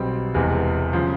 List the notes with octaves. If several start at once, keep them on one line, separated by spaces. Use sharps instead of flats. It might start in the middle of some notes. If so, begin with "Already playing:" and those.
Already playing: B1 B2 G3 C4
E1 E2 C3 E3 G#3
C#3 F3